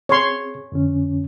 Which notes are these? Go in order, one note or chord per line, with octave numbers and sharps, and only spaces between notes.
C4 G#4 C#5 C6
F2 D3 C#4